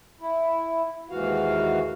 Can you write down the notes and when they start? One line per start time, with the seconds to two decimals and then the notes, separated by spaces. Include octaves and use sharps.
0.21 E4
1.10 D#2 G#2 E3 F#4 F5